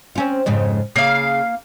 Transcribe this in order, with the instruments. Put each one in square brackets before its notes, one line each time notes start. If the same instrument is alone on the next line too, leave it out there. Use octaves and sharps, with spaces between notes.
[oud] C4 C#4 F4
F2 G#2 C#3
[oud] C#3 [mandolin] A#3 F5